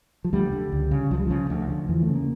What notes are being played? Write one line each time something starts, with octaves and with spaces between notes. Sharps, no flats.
F3
D2 G3
D3
C#2
C#3
C#2 F3
G3
C#3 F3
D2
D3
E2 E3
A3
C#3
A#3